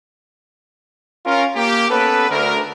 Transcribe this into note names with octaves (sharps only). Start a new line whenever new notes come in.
C#4 F4 A#4
A#3 G4
B3 C#4 A4 B4
D2 A#4